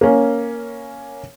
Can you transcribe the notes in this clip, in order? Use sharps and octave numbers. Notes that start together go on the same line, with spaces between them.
A#3 C#4